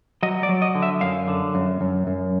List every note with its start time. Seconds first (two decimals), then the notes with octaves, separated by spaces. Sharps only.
0.23 F#3 D#5
0.43 D5
0.49 F#3
0.62 D#5
0.75 D3
0.82 E5
1.01 F#2 F5
1.28 D3
1.55 F#2
1.81 F#2
2.07 F#2